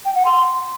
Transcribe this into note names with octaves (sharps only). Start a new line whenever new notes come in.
G5
F#5
C6